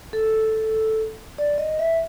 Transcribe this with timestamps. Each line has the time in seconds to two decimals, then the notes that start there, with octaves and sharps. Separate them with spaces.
0.13 A4
1.38 D5
1.58 D#5
1.79 E5